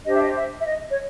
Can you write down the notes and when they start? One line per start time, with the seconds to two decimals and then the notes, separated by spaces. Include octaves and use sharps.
0.06 D4 G4 C5 D#5
0.14 E5
0.23 D#5
0.36 E5
0.60 E5
0.66 D#5
0.90 C#5